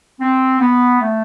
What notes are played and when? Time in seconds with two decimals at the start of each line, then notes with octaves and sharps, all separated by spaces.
0.20 C4
0.60 B3
1.01 A3